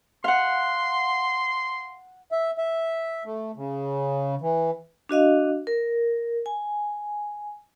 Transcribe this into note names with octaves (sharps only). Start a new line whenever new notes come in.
F5 F#5 C6
E5
E5
A3
C#3
E3
D4 F#4 D#5 F5
A#4
G#5